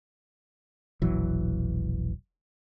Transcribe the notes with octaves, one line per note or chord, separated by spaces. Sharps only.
E1 A#1 E3 F#3